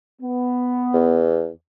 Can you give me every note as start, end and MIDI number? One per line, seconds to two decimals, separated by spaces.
0.22 1.28 59
0.93 1.50 40